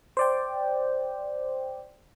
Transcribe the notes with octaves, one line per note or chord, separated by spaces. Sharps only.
C5 D5 G5